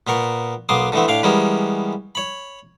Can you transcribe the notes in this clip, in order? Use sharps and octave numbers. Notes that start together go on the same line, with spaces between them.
A#2 B3 A#4 C#6
B1 A#3 B3 C6 D6 D#6
D3 E3 A3 B3 C4
A2 D4 F5 D6
E3 G3 G#3 B3 C#4 A#4
C#5 B5